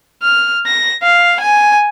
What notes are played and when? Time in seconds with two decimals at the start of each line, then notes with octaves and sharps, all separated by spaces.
0.23 F6
0.65 A#6
1.03 F5
1.40 G#5